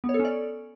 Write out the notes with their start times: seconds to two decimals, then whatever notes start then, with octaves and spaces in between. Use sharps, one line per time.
0.04 B3
0.09 C#5
0.14 A4
0.19 C#4
0.25 D5